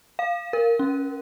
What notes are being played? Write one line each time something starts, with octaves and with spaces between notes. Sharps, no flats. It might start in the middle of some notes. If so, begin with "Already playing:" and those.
F5
A#4
C#4